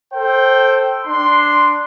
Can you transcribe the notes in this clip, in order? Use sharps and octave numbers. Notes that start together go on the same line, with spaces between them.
A4 C5 G5
D4 C6